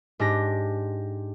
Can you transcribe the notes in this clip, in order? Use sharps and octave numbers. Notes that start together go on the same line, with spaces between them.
G#2 D4 G4 A#6